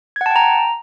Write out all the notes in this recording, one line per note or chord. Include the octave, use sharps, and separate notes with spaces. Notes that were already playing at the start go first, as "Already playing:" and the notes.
F#5 G5 A5 A#5 G#6